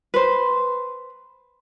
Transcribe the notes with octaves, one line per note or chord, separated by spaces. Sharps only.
B4 C5